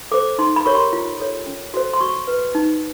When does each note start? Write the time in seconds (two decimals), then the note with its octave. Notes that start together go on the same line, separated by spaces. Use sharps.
0.12 A4 C5 D6
0.38 D#4 C6
0.56 B5
0.65 G4 A#4 C#5 C#6
0.75 C6
0.93 F4
1.20 A4 C#5
1.47 C#4
1.74 F#4 A4 C5
1.94 C6
2.01 F#4 C#6
2.27 B4
2.55 D#4